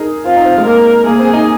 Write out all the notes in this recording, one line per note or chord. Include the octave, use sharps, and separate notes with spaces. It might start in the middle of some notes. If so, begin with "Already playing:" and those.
Already playing: D#4 G#4 A#4
C4 F4
D#4
C4
G#3
A#3 A#4
A#3 G#4
C4
D#4